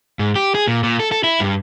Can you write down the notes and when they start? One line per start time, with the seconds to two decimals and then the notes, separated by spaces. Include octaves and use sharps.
0.19 G#2
0.36 G4
0.55 G#4
0.68 A#2
0.83 A#2
0.99 A4
1.12 A4
1.24 E4
1.40 G2